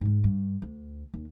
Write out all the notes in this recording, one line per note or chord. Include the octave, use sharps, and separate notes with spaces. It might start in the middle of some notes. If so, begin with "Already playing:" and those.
G#2 G#3
G2
D2
D#2